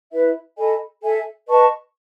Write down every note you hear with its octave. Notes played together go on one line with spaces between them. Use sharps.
E4 B4 E5
A4 D#5 G#5 B5
A4 E5 G#5
B4 D#5 A5 C#6